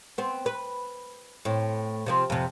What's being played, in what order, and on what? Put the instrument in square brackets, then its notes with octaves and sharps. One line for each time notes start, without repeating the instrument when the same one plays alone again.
[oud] B3 C4
B4
A2 C4
C3 F3 C4
F2 C3